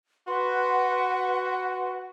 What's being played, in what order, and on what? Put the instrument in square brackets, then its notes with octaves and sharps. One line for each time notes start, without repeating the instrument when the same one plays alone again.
[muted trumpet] F#4 [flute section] B4 F#5 [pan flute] C6